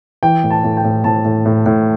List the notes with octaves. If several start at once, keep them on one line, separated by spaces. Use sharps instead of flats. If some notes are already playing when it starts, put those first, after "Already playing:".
E3 G5
A2
A5
A2
G5
A2
A2 A5
A2
A2
A2